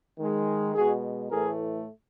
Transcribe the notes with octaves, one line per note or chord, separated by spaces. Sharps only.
D#3 G#3
B2 G#3 F#4 G#4
A2 E3 A3 G#4 A#4